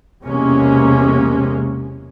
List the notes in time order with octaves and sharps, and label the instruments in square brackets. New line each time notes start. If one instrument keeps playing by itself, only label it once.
[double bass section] B1 E2 C3 G#3 A#3 C#4